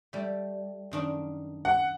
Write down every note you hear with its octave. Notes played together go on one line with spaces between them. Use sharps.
G3 A3
F#2 D#3 D4
F#5